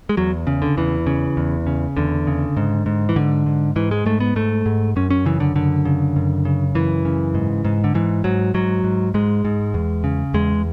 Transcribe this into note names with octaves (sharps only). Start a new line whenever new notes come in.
G#3
E2 F#3
C#3
D3
E2 E3
C#3
E2
C#3
E2 D3
C#3
G#2
G#2
E3
G#2 D3
G#2
G#2 E3
G#3
G#2 A3
B3
G#2 A3
G#2
F#2 C#4
C#4
C#3 E3
D3
F#2 D3
C#3
F#2
C#3
F#2 E3
C#3
G#2
G#2
D3
G#2 E3
G#2 F#3
G#2 F#3
G#2
G#2 G#3
G#2
E2
C#3
E2 G#3